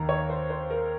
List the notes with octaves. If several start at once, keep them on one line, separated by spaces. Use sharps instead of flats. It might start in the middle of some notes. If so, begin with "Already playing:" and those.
Already playing: D#2 D#3 A#5
C#5
C5
C5
A#4